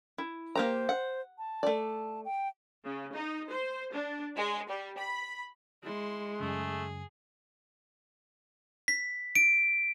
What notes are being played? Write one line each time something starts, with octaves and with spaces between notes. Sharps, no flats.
E4
A#3 G4 C5 A#5
F#5
A5
A3 D5
G5
C#3
D#4
C5
D4
G#3
G3
B5
G#3 E4 C6
F#2 C#3 A3 G#4
B6
D7